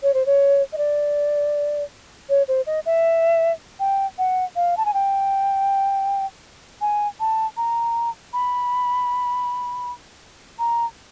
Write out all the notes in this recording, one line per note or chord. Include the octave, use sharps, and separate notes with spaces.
C#5
C5
C#5
D#5
D5
C#5
C5
D#5
E5
G5
F#5
F5
A5
G#5
G5
G#5
A5
A#5
B5
A#5